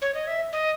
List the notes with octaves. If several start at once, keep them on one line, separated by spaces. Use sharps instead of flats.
C#5
D#5
E5
D#5